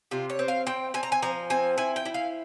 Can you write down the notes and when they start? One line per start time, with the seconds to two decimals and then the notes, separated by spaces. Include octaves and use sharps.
0.11 C3 F4
0.30 C#5
0.39 C4
0.48 F5
0.67 C4 G5
0.94 C4 G#5
1.03 A#5
1.12 G#5
1.22 F3 A#5
1.50 C4 G#5
1.78 E4 G#5
1.96 G5
2.05 E4
2.14 F5